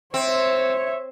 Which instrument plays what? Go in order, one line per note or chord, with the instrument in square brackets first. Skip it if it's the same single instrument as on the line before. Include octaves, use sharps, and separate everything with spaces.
[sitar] C4 [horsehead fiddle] C#5 E5